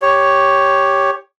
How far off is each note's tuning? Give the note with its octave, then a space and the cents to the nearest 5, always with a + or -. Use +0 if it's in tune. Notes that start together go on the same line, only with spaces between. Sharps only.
G4 +0 C#5 +0